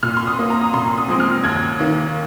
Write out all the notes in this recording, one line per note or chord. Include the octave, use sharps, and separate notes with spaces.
A#2 F6
C6
D#6
A#3
A#5
D#6
A#2 C6
D#6
F3 G#3 C4
F6
D#2 G#6
D#3 A#3